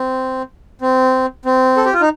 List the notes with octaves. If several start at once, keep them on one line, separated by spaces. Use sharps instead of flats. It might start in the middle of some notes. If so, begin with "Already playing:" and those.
Already playing: C4
C4
C4
A4
G4
F4
D#4